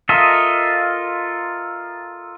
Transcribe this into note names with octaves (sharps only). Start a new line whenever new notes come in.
F4 A4 A#4 D#5 E5